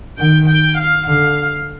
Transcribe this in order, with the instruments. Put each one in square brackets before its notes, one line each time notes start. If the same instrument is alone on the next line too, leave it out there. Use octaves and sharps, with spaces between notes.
[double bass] D#3 [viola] G5
[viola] G5
F5
[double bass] D3 [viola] F5